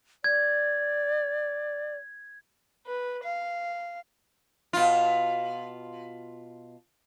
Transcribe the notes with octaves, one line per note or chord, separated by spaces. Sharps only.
D5 G#6
B4
F5
B2 F4